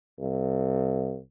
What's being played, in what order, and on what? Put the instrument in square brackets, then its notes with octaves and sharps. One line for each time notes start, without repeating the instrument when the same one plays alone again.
[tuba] C2